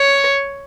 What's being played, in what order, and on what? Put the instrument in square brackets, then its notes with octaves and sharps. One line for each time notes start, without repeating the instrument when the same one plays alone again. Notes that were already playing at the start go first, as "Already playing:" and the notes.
Already playing: [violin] C#5